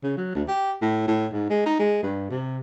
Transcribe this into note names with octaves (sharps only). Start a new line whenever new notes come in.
C#3
F#3
D2
G4
A2
A2
G#2
G#3
D#4
G#3
G2
C3